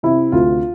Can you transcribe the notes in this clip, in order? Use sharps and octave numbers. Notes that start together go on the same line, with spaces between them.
C3 E4
D2 F4